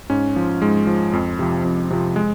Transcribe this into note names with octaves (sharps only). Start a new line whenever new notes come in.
G#2 C#4
F3
G#2 G#3
F3
F2
C3 F3
F2
C3 F3
G#3